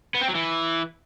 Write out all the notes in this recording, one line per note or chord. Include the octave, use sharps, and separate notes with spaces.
B3
C4
F#3
E3